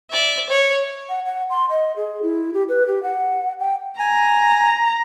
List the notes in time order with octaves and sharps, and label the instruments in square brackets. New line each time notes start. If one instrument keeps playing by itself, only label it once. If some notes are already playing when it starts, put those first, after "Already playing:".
[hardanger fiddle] D5 E5
C#5
[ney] F#5
F#5
C6
D#5
G#4
E4
G4
B4
G4
F#5
G5
[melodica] G#5 [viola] A#5